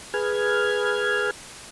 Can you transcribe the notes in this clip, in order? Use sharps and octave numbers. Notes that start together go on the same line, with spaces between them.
G#4 B4 F6 G#6